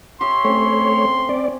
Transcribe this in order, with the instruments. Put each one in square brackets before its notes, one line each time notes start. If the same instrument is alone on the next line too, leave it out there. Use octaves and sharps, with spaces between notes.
[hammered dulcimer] G4 C#5 E5 [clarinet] C6
[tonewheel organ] A3 C#5 [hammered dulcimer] C4 C#4 G4
[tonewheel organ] C4 D5